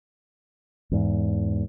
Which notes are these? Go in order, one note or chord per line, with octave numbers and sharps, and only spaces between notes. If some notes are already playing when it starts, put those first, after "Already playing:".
E2 G#2